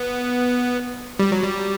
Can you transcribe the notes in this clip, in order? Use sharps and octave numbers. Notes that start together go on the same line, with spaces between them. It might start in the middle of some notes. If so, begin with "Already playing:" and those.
Already playing: B3
G3
F#3
G3